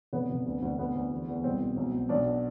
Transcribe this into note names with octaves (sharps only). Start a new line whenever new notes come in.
F1 B3
F1
D2
D2
D2 B3
D2
E2
E2
C2 C4
B2
B1
B1
B1 D4
B2